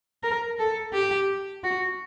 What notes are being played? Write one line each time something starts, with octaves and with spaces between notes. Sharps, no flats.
A#4
A4
G4
F#4